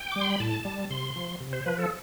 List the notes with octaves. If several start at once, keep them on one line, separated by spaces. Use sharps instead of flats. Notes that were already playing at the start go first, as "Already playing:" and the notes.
Already playing: G5
G3 D6
C6
B5
A2 A5
G3
C3 C6
F3
C3
C5
F3 B4
A4